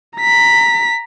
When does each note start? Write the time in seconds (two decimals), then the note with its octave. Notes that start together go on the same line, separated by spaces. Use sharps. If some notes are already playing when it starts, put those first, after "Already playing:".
0.18 A#5 B6